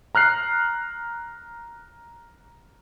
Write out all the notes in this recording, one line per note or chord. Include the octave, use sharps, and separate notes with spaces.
A#5 F6 F#6 C7